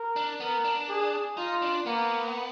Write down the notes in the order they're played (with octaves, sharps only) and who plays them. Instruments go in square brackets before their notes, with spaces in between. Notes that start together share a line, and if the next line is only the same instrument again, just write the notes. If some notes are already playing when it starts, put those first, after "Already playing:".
Already playing: [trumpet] A#4
[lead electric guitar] D4
[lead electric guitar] B3 [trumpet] A#4
[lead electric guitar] D4
[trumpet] G#4
[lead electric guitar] D#4 [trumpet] F4
[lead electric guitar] D4
[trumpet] A#3 [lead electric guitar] B3